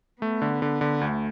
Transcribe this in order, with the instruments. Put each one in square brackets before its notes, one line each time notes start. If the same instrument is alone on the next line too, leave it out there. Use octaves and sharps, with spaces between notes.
[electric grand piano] A3 [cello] B3
[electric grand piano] D3
D3
D3
[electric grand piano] D2 [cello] A3